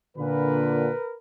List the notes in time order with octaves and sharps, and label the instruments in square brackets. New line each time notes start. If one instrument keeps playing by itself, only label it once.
[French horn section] A#2 D3 [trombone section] A#4 B4